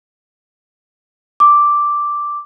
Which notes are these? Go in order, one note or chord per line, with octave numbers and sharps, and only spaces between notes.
D6